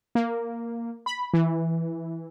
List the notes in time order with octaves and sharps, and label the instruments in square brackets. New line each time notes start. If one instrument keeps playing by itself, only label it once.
[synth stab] A#3
B5
E3